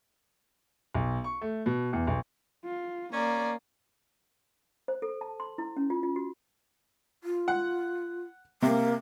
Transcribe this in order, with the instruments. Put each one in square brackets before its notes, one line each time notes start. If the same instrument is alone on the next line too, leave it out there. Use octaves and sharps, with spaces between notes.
[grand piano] B1
C#6
A3
B2
E2
B1
[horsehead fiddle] F4
[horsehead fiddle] A#3 [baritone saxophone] C#4 [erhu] D5 [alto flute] A#5
[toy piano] C5
A4
A5
C6
E4
C#4
F4
F4
F#4
[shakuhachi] F4
[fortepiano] F#5
[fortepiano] C3 [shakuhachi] A#3